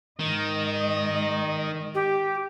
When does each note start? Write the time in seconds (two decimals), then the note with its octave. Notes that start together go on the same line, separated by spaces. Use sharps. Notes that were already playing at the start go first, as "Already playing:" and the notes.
0.19 G#2 D#3 D#5
1.94 G4